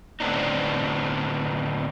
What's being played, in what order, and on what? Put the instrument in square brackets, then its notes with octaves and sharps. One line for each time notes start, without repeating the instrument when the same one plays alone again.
[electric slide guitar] A2 D3 B3 C4 D4 D#4